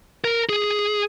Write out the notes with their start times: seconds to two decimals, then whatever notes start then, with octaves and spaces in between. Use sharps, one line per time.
0.24 A#4
0.49 G#4